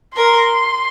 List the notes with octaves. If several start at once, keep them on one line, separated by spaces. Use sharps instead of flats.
A#4 C6